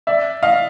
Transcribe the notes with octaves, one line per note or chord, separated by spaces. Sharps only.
D5 E5
D#5 F5